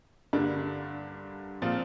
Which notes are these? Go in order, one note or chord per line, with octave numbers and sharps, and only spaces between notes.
G2 D3 G3 A#3 D4
A#2 F3 C4 F4